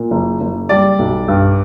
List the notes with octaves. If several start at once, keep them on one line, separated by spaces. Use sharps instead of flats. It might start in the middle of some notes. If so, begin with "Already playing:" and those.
Already playing: A#2
F#1
F#1
G3 D5
B1
G2